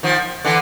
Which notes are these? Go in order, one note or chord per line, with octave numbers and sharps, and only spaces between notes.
D#3 F3
D3 E3